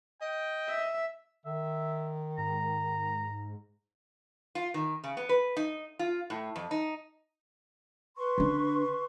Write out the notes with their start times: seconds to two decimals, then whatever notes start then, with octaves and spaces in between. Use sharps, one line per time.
0.22 D#5 G5
0.69 E5
1.45 D#3 E5
2.38 G#2 A#5
4.55 F4
4.74 D#3
5.04 C#3
5.17 B3
5.29 B4
5.57 D#4
5.99 F4
6.30 A2
6.56 F2
6.71 D#4
8.17 B4 C6 C#6
8.38 D3 D4